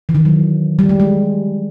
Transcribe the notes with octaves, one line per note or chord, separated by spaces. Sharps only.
E3
D#3
F#3
G3
G#3
G#3